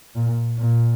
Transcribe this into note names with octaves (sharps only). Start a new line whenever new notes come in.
A#2
A#2